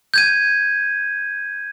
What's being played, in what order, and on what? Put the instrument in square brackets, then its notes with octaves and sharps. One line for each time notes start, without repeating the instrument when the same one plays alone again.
[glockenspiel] G6 G#6 D#7